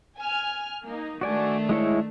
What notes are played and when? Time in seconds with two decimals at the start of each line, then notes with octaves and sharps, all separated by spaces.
0.19 G#5 F6
0.87 A#3 D#4
1.21 D#3 A3 D4 F#4 D5 G#5
1.69 G#3 E4 C#5